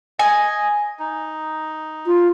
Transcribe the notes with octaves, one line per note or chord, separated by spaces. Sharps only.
D#5 G#5
D#4
F4